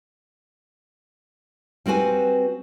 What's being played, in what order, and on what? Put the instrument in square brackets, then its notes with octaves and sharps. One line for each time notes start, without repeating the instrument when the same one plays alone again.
[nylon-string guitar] G3 C4 F#4 B4 G#5